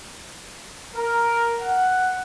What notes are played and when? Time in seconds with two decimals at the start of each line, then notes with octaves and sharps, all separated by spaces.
0.96 A#4
1.60 F#5